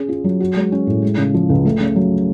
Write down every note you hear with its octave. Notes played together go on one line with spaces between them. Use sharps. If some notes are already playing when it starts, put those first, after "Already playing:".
Already playing: C#4 G#4
F4
F#3
F#4
G#3
C#4
A2
G#3
C#3
F3
C#2
A3
C#3
F#3